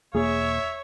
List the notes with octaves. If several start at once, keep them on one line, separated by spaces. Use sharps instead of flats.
E1 A#3 G#4 C#5 E5